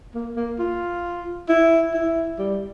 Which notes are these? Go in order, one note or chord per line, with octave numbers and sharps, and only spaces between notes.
A#3
A#3
F4
E4
E4
G3